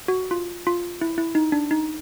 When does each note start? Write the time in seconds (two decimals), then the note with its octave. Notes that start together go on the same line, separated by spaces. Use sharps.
0.08 F#4
0.31 F4
0.67 F4
1.01 E4
1.18 E4
1.35 D#4
1.52 D4
1.71 D#4